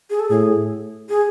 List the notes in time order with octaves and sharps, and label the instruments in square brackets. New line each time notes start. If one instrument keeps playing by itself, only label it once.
[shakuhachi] G#4
A4
[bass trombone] A2 [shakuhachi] G#4
[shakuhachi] G#4